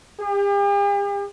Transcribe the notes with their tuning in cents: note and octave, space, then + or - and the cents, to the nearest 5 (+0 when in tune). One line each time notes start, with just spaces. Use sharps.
G4 +45